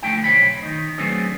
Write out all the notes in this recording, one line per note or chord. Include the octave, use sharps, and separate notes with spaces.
D3 F3 A3 E4 G5
B1 E3 C5 C#5 B5
D#3 D#4
F#3 A3 B3 C4 D4 G#4